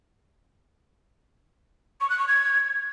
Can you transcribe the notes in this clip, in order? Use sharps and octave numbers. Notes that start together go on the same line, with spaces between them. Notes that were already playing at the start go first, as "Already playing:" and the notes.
C#6
F#6
C#6
G#6